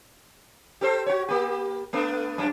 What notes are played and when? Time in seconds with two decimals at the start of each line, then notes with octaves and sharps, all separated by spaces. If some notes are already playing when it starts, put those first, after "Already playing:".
0.81 G4 A4 C5
1.06 F#4 C#5
1.28 A#3 G4
1.93 A3 B3 D4
2.38 F#2 D4